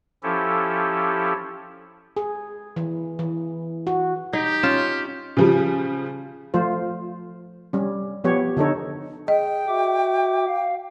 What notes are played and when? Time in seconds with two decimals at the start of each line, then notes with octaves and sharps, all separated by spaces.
0.23 F3 C#4 E4 G4 A4
2.17 G#4
2.76 E3
3.19 E3
3.87 F#4
4.33 D#4 G4
4.63 C#4 F4 E7
5.37 C#3 F3 G3
6.54 F3 A3 F4 C5
7.73 G3 C#4
8.24 F3 B3 G4 C#5
8.57 D3 D#4 A4 C#5
9.28 G#4 D#5 G5
9.68 F#4 E5 D6
10.48 F5